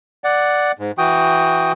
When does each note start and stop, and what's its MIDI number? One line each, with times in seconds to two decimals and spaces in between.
0.24 0.72 74
0.24 0.72 78
0.79 0.91 44
0.98 1.72 52
0.98 1.72 66
0.98 1.72 79
0.98 1.72 87